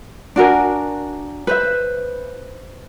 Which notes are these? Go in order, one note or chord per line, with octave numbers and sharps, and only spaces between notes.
D4 F#4 A#4 G#5
B4 C5 E5